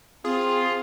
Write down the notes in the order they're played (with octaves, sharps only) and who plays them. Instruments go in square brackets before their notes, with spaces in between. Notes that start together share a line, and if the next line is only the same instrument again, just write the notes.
[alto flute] C4 [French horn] F4 [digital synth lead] G#4